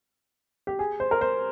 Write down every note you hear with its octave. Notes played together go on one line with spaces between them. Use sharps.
G4
G#4
C5
A#4
C5